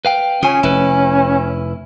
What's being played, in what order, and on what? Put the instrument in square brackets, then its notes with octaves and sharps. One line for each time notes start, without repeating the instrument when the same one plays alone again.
[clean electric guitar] B4 F5 G5
[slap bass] C#3 [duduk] C#4 [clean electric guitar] F4 G#5
[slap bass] F1 [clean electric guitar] E4 B4